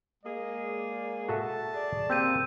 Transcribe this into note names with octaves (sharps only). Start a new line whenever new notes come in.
G#3 A#3 G#4 D#5
D5
F#4 A4 E5 A5
G#4 D5
A#3 C4 G4 E6 G6 D#7